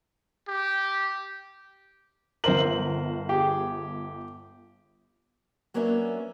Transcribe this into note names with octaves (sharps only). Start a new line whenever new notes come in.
G4
G1 A#4 C5 E5 F#7
G4 G#4
F#3 A#3 B3 C#4 D4 E5